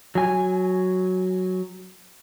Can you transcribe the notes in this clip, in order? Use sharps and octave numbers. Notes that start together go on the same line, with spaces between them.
F#3 G#5